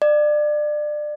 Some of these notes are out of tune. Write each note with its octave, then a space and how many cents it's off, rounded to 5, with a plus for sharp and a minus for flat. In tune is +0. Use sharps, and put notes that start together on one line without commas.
D5 +25